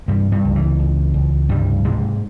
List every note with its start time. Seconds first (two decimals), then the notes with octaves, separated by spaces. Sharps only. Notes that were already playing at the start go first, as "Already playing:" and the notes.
0.08 G2 C3 G3
0.32 G2 G3
0.44 C#2
0.56 E3
0.79 C#2
1.14 C#2
1.49 G2 C3 G3
1.85 G#2 C3 G#3